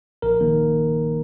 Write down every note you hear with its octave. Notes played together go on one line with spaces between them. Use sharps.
A#1 A#4
D#3 A#3